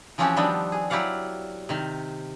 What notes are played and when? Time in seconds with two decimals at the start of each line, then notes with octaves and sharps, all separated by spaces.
0.18 E3 F3 C4 C#4 F#4 G4
0.36 D#3 F3 G3 B3 C4 D4
0.72 G#4
0.90 F#3 E4 G4 D5 F5 F#5
1.69 C3 D#3